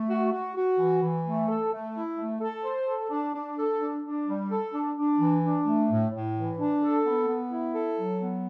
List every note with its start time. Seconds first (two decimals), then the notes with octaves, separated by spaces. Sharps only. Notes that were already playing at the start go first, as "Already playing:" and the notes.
Already playing: A3
0.09 F#4
0.32 F#4
0.56 F#4
0.78 E3
1.03 E3
1.26 A3
1.48 A4
1.72 A3
1.95 E4
2.17 A3
2.41 A4
2.64 C5
2.87 A4
3.10 D4
3.34 D4
3.57 A4
3.81 D4
4.04 D4
4.27 G3
4.50 A4
4.73 D4
4.96 D4
5.19 E3
5.43 D4
5.65 A3
5.89 A2
6.11 A2
6.34 E3
6.58 D4
6.81 A4
7.05 B3
7.27 B3
7.51 E4
7.73 A4
7.97 F#3
8.20 B3